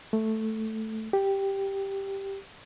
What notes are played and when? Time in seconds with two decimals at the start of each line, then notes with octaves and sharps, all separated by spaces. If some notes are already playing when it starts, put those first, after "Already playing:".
0.13 A3
1.13 G4